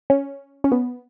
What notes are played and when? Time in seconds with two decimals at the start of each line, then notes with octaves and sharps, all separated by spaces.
0.10 C#4
0.64 C#4
0.72 B3